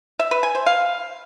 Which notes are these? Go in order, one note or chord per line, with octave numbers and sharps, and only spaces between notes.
E5
B4
G#5
C5
F5